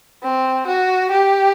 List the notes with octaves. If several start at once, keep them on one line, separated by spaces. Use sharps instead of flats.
C4
F#4
G4